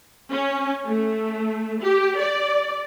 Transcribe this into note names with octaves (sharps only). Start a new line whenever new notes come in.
C#4
A3
G4
D5